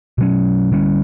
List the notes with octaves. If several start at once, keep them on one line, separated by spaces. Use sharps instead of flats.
B2 F#3 C#4
D3 G3 C#4